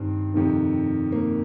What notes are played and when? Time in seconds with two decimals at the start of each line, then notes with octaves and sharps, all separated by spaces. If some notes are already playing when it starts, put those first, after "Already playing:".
Already playing: G2 D#3 C4
0.34 F2 C3 D#3
1.12 A#3